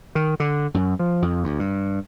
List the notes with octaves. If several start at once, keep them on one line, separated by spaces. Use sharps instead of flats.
D#3
D3
F#2
F3
F2
D2
G2